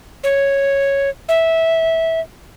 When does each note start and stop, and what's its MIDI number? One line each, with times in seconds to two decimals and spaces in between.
0.24 1.09 73
1.29 2.20 76